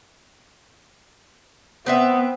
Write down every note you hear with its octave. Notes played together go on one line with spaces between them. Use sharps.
B3 C4 B4 E5